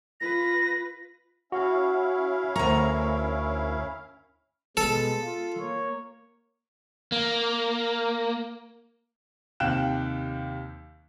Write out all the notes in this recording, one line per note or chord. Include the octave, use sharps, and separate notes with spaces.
F4 B4 A#6
C#4 E4 F#4 F5 F#5
D2 A#4 A#5 C#6
B2 G#3 B3 A4
F4
A#3 C#5
A#3
D#2 C3 F5 G5 F#6 E7